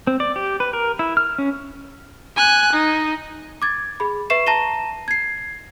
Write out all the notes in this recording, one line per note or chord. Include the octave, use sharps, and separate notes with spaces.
C4
D5
G4
B4
A#4
E4
F6
C#4
G#5 F#6
D#4
D6 G#6 A6
G#4 B5
B4 E5 C#6 C7 E7
A5 A#5 A#6 D#7 E7 G7
G#6 C7